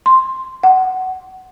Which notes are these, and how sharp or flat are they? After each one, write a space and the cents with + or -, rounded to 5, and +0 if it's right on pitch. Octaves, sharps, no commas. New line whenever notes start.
C6 +0
F#5 +15